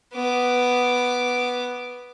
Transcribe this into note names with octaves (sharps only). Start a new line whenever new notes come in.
B3 D6